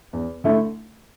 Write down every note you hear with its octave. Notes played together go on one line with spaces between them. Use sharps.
E2
D3 A3 E4